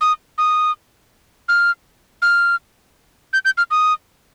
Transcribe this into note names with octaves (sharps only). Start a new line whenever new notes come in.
D#6
D#6
F6
F6
G6
G6
F6
D#6